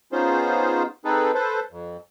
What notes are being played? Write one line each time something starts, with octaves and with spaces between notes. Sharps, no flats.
B3 C#4 D#4 F4 G#4 C5
C4 D#4 G#4 A4 B4
A4 B4 C5
F2